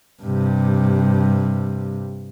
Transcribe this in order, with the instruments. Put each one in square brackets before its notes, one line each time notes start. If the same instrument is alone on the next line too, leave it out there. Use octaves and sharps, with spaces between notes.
[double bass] G2 C3